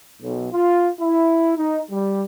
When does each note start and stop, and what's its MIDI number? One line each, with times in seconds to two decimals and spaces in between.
0.21 0.47 35
0.52 0.88 65
1.00 1.52 64
1.57 1.81 63
1.90 2.23 55